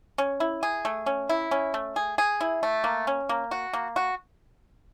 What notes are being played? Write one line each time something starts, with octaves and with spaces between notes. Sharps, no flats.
C#4
E4
G#4
A3
C#4
E4
C#4
A3
G#4
G#4
E4
A3
A#3
C#4
A#3
F#4
A#3
F#4